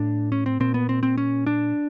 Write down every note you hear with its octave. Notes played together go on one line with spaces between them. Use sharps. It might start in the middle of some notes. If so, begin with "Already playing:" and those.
Already playing: A2 D4
C#4
C4
A#2 C4
B3
C4
C4
C#4
D4